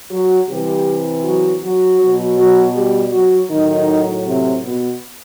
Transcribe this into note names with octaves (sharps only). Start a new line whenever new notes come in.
F#3 F#4
C3 E3 G3 G4
F#3 F#4
F#3 F#4
B2 F#3
F#3 F#4
G3 G4
F#3 F#4
A2 D#3 F#3 D#4
C3 C4
B2 B3